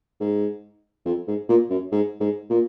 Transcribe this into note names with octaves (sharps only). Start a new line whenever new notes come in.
G#2
F2
G#2
A#2
F#2
G#2
G#2
A#2